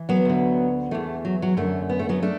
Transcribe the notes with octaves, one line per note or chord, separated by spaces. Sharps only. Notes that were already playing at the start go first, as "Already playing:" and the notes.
Already playing: E3
F#3 B3
D2 D3
E2 E3 A3
F#3
F#3
F#2 D3 A3
B3
A3
F#3 B3
A3 D4